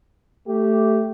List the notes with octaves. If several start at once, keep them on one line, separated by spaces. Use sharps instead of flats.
A3 G4